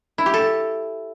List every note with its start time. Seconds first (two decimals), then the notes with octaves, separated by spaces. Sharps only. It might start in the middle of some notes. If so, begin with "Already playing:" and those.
0.18 E4
0.26 G4
0.34 A4